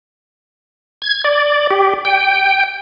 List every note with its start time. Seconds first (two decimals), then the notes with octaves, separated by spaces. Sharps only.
1.02 G#6
1.24 D5
1.71 G4
2.05 G5